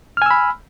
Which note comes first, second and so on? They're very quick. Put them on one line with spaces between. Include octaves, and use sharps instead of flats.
F6 G#5 E6 B5